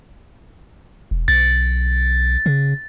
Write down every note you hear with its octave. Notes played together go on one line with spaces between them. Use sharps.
E1
B1 A6
C#3